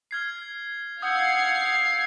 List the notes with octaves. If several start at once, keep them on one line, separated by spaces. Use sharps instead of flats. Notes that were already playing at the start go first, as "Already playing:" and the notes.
F6 G#6 C7
F5 F#5 D#6 E6 G6 G#6 C7